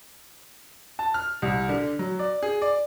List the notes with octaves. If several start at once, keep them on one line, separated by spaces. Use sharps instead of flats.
A5
F6
C2
D3
F#3
D5
G#4
D5